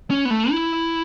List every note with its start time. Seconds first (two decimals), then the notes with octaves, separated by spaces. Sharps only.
0.11 C#4
0.25 B3
0.30 A3
0.51 E4